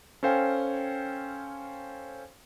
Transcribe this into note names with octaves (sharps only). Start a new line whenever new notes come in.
C#4 A4 C5 F5 G5 G#5